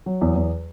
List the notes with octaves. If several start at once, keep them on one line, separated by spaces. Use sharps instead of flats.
F#3
E2
E2